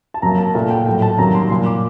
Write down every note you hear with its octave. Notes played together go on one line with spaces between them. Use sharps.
A5
F#2 F#3 A#3 A#5
A5
A#2 A3 A5
G5
A2 F#3 A3 G5
A5
F#2 D#3 G3 A#3 A#5
C6
A#2 F#3 A#3 C6
D6